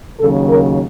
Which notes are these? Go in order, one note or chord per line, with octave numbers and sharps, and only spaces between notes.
D#2 C#3 F#3 A4
A#4